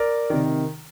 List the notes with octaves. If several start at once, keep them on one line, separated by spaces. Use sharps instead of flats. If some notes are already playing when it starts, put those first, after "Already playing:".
Already playing: A#4 D5
C3 D#3